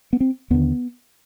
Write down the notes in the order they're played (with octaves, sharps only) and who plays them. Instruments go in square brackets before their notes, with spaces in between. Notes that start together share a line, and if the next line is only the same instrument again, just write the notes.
[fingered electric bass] B3
C4
D#2 D3 B3